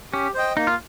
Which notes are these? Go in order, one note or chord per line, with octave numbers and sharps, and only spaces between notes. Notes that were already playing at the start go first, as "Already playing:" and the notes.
C#4 G4
C5 D#5 G5
A#3 D#4
F4